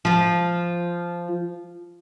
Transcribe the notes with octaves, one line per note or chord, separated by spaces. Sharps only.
F3 F4